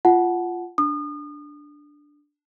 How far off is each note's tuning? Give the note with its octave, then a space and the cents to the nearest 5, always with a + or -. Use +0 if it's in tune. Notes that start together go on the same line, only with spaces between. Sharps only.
F4 -10 F#5 +0 A5 -35
D4 +0 D#6 -35